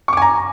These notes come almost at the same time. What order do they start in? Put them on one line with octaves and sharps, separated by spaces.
C#6 D6 G#5 A#5